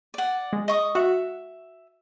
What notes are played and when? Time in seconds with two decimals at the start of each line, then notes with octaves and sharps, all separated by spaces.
0.14 D5 F#5
0.53 G#3
0.68 D#5 C#6 D#6
0.95 F#4 E5 F#5